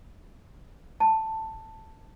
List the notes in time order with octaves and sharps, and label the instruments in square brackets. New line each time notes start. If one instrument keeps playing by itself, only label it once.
[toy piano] A5